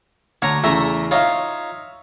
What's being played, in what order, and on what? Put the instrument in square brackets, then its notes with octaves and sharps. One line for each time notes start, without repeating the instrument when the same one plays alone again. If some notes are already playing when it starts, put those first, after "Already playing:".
[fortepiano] D2 [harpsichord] C#5 A#5
[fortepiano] E2 C#3 [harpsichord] A3 E5 A#5
[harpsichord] D#4 F4 [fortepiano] C#5 E5 F5